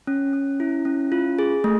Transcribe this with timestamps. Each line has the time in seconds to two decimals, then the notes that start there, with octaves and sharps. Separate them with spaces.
0.07 C#4
0.33 C#4
0.60 E4
0.85 C#4
1.12 F4
1.39 G#4
1.64 A3